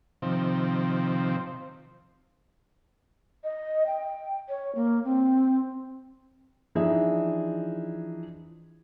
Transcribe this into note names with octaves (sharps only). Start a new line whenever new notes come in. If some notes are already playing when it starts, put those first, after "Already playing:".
C3 D#3 F3 C4
D#5
G5
C#5
A#3
C4
E3 F3 D4 D#4 G#4 E5